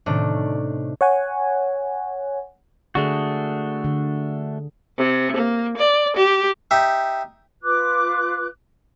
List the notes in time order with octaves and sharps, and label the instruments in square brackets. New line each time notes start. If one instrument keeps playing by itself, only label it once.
[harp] A2 C3 D#3 A3 C#4 D4
[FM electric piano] C#5 F#5 G#5
[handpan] D3 G#4 [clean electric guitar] A3 D4 F#4
[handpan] D3
[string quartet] C3
A#3
D5
G4
[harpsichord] D#4 G4 E5
[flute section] F4 B4 D6 F#6